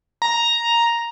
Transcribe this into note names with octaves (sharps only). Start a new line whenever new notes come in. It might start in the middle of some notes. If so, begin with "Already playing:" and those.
A#5